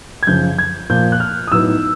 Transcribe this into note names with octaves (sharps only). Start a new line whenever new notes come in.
G#6
F#2 C#3 F3 G6
G#6
A#2 F3 A#3 G6
F#6
F6
D#6
A2 F#3 B3 D#4 E6